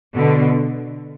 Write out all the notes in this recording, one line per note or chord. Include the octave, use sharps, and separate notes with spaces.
B2 D3